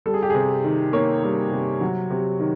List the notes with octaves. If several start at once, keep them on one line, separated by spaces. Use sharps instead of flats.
G3 A4
G#4
G4
C3 G#4
D#3
A#3 C#5
G3
C3
F#3
C3
D#3